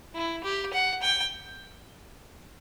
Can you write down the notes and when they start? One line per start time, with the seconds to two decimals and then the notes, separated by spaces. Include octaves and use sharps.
0.15 E4
0.44 G4
0.73 F#5
1.02 G5